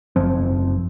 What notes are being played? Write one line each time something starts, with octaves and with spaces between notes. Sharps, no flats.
F#1 F3 C4